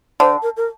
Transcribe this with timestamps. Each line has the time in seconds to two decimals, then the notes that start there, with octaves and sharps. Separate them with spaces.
0.20 D3 C5
0.43 A#4
0.57 A#4